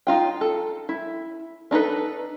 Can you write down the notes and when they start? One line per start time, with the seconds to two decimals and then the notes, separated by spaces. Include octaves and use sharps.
0.07 D#4 F4 G5
0.41 A4
0.89 E4
1.71 D4 D#4 A4 B4